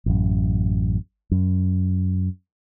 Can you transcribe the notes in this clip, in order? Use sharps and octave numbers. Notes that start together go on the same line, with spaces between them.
A1 F#2
F#2